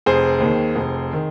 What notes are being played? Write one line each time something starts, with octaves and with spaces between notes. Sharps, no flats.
F1 G#4 C5
D#2
D#3
F1
D#3